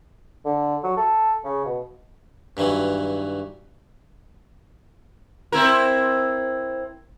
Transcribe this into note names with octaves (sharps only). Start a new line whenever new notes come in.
D3
F#3
A4
C#3
B2
G2 D#3 E3 F#3
C4 E4 A#4